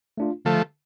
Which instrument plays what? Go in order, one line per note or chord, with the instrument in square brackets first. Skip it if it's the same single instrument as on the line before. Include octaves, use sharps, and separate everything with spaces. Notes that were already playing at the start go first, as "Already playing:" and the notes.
[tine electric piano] A3 D4 F4
[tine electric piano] D3 [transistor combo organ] F3 A3